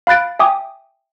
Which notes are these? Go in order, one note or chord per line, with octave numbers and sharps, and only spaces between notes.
F5 B5 F#6 A6 D7
E5 G5 G#5 D6 D#6